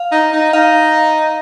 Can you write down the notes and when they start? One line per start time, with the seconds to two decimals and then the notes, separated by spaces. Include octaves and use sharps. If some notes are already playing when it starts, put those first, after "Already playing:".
Already playing: F5
0.12 D#4
0.32 D#4
0.53 D#4 F5